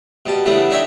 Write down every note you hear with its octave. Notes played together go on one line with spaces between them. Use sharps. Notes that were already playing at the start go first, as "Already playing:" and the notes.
B2 G3 A5
C#3 E3 G3 A3 B3 D4
D4 D#4 A#4 C#5 E5 G5